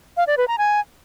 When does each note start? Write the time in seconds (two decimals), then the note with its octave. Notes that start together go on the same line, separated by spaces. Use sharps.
0.17 F5
0.27 D5
0.38 B4
0.48 A#5
0.58 G#5